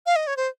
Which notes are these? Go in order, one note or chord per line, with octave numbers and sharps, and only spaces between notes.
F5
D#5
C#5
C5